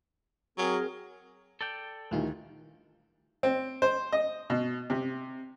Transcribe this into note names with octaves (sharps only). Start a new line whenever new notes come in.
F#3 C4 G#4 A#4
A4 D5 G5
D2 D#3 E3 A3 F4 G4
C4
C5
D#5
B2
C3